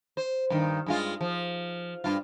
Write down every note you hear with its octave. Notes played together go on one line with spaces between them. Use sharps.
C5
G2 D#3
G2 G#3 F4
F3
G2 F4